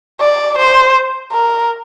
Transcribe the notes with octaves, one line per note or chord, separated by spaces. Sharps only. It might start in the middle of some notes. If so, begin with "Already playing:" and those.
D5
C5
A#4